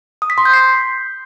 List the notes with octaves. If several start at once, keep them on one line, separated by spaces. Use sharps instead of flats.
D#6
B6
C6
G6
C7